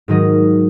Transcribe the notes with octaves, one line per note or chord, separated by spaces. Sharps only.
G#2 D#3 F#3 D#5